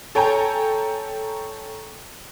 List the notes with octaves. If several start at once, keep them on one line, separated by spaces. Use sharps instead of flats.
A4 C#5 G5 G#5 A#5